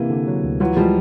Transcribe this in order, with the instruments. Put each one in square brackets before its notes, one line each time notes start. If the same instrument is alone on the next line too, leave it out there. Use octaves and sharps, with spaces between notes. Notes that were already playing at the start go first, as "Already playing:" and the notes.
Already playing: [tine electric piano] C3 A#3 [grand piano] E3
[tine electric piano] D3
F#3
D2
[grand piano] E3 F#3 [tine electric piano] F4
[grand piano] F3 G3 [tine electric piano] G#3